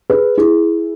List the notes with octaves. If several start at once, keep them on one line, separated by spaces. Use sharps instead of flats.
G#4 B4
E4 G#4